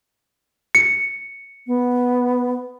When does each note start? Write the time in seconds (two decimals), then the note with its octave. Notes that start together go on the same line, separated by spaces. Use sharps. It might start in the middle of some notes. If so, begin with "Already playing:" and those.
0.75 C#7
1.67 B3